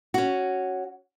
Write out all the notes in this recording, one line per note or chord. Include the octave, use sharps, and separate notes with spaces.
C#4 F#4